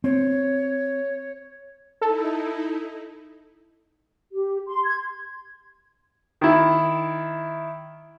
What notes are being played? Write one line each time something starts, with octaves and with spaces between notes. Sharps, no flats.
C4 C#5
D#4 E4 A4
G4
C6
G#6
D#3 E4